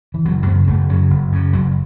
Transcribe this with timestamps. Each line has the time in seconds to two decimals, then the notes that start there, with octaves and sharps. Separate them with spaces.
0.14 E3
0.25 F#1 F#3
0.46 F#2 C#3 B3
0.68 F#1 A3
0.89 F#2 C#3 F#3
1.10 F#1
1.32 F#2 C#3
1.53 F#1 F#3